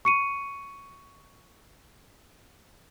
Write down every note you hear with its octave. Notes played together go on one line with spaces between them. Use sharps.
C#6 C#7 D#7